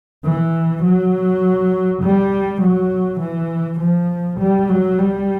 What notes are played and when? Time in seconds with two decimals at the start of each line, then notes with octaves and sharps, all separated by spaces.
0.25 E3
0.84 F#3
2.03 G3
2.62 F#3
3.21 E3
3.80 F3
4.40 G3
4.69 F#3
4.98 G3